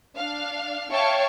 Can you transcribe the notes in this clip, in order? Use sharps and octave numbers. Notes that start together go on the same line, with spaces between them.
D4 F5
C#5 E5 F5 G5 A5 C#6